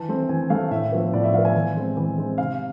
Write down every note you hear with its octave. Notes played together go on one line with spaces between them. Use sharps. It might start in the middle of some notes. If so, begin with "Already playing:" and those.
Already playing: E3 A5
A3 C4
E3 G#5
A3 C4 F5
A2 E5
F3 B3
A2 D5
E5
F3 B3 F5
G#5
E3
G#3 C4
E3
G#3 C4
C3 F5